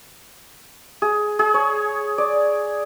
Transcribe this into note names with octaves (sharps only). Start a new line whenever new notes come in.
G#4
G#4
C#5
D5